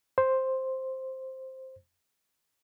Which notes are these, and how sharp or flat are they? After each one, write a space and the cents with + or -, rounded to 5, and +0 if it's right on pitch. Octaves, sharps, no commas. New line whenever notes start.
C5 +5